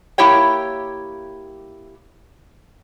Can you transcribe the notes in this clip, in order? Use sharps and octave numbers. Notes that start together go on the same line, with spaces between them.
A#3 E4 G4 C#5 G5